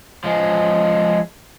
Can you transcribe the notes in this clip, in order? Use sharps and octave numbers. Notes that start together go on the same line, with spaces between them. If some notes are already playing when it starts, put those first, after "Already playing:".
F3 G#3